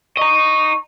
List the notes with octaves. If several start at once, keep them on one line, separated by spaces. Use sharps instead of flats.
D#5 A#5 C#6